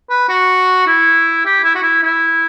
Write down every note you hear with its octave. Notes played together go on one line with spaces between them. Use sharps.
B4
F#4
E4
G4
E4
F#4
E4
E4